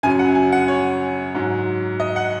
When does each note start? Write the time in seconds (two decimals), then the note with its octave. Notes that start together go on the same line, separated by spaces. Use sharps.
0.03 F#2 C#3 F#3 G#5
0.19 F#5
0.35 G#5
0.52 F#5
0.68 C#5
1.35 G#2 F#3
2.00 D#5
2.16 F#5